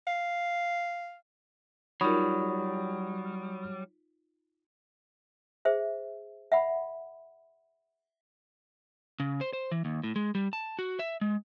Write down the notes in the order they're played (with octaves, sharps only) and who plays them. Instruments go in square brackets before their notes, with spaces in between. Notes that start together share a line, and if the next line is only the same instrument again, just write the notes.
[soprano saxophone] F5
[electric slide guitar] F#3 G3 [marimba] D#4 F4 A#4 [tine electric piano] B5 C#6 D#6
[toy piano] G#4 C5 E5
E5 F#5 B5
[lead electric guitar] C#3
C5
C5
E3
D#2
A2
G#3
G3
A5
F#4
E5
G#3